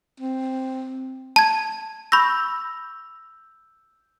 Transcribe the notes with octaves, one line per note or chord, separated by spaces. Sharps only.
C4
A5 G#6
B5 C#6 E6 G6 A#6